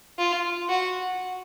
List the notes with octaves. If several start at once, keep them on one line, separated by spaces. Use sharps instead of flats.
F4
F#4